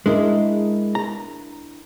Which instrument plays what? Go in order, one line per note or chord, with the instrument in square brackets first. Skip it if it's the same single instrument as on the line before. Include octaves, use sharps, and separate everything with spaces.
[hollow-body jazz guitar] G#3 [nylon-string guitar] D4 E4 A#4
[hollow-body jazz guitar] A#5